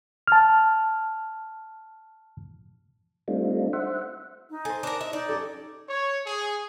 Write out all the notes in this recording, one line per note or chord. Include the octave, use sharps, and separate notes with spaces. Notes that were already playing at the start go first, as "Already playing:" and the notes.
A5 F6
G3 A3 C4 D4 D#4 F4
C5 E5 F#5
D#4
A4 C5 G#5
D4 A#4
D#5 E5
D#4 D5
C#4 G4 A4
C#5
G#4